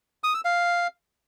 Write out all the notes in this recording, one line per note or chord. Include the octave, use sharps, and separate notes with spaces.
D#6
E6
F5